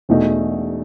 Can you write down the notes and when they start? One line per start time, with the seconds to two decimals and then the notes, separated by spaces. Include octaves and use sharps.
0.09 E1 E2 B2 A3 D#4